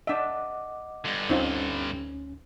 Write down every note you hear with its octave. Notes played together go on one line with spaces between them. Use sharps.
D4 D#5 E5 F#5 D6
G2 D3
D2 C4 C#4 D#4 F4